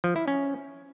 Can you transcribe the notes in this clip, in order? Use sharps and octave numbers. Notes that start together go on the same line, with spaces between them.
F3
E4
C#4